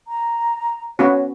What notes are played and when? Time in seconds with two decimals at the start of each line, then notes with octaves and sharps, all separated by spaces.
0.08 A#5
0.99 B3 C#4 F#4 C#5